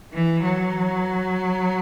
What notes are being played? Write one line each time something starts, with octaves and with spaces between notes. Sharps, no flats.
E3
F#3